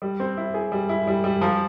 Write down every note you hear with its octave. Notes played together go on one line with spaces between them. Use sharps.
G3
C4
E4
G#4
G3
E4
G3
G3
F3